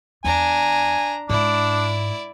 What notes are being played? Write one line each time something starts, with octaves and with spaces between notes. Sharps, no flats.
E2 D4 G#5 A#5
G#2 D4 E4 D5